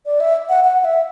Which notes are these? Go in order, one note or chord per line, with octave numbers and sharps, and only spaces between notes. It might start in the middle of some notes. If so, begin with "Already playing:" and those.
D5
E5
F#5
F#5
E5